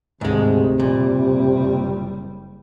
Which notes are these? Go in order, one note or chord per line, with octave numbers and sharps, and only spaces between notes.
D2 G#2 C3 D#3 G#3
F#1 A#2 G3